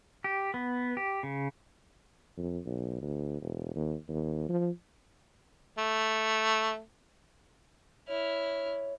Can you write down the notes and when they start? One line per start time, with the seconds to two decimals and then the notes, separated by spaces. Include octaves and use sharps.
0.24 G4
0.54 B3
0.97 G4
1.23 C#3
2.37 F2
2.66 B1
3.01 D2
3.42 E1
3.76 D#2
4.09 D#2
4.49 F3
5.79 A3
8.08 E4 C#5 F6